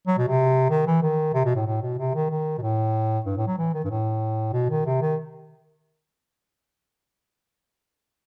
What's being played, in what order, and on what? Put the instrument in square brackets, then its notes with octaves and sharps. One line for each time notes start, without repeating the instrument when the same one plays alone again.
[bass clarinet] F#3
B2
C3
D#3
E3
D#3
C3
B2
A2
A2
B2
C3
D#3
D#3
B2
A2
G2
A2
F#3
E3
D#3
G2
A2
B2
D#3
C3
D#3